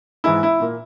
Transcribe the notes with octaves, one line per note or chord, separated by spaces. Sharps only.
G#2 E3 G#3 E4
E4
A#2 A#3